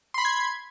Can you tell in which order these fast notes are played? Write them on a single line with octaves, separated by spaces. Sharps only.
C6 B5 C7 G#6